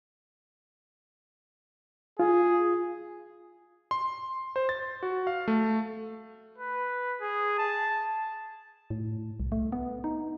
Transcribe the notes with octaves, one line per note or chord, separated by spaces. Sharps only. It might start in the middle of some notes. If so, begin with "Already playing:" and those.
F4 G#4
C6
C5
A6
F#4
F5
A3
B4
G#4
A5
A2
C2
A3
B3
D#4